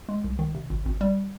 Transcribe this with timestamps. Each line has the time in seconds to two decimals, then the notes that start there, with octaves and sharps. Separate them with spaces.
0.09 G#3
0.24 C2
0.39 D#3
0.55 C3
0.70 G#1
0.86 G#1
1.01 G3